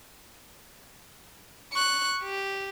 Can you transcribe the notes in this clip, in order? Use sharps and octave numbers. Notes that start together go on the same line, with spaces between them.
C#6 F#6
G4